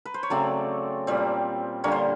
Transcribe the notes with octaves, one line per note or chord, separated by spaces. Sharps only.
B4
C5
C#5
C#3 F#3 A3 C4 D5
A#2 G3 C4
D3 G3 A#3 C#5
C5